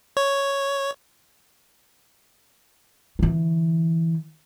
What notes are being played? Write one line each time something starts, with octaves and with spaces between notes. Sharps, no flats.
C#5
D3 E3